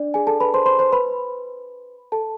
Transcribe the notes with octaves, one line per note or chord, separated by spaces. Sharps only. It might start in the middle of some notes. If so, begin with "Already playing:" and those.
Already playing: D4 D5
G#4 G#5
A4 A5
B4 B5
C5 C6
C5 C6
C5 C6
B4 B5
A4 A5